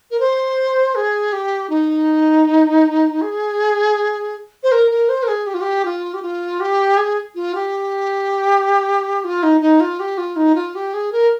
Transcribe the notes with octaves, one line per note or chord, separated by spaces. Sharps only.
A#4
C5
G#4
G4
D#4
G#4
C5
A#4
A#4
C5
A#4
G#4
G4
F4
G4
F4
G4
F4
G4
G#4
F4
G4
F4
D#4
D#4
F4
G4
F4
D#4
F4
G4
G#4
A#4